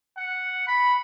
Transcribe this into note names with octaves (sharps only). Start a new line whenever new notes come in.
F#5
B5